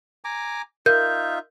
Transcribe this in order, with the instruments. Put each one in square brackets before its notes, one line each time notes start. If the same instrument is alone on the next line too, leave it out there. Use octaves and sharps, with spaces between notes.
[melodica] G#5 A#5 D6
[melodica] D#4 F4 E5 [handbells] A#4 [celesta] G6